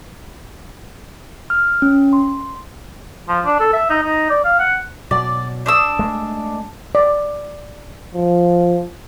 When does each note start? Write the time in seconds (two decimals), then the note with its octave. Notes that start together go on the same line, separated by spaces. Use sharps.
1.50 F6
1.82 C#4
2.13 C6
3.28 F3
3.46 D4
3.60 A4
3.73 E5
3.89 D#4
4.02 D#4
4.30 D5
4.44 F5
4.59 F#5
5.11 B2 F#3 D5
5.66 D4 D#6 E6
5.99 G#3 A3
6.95 D5
8.15 F3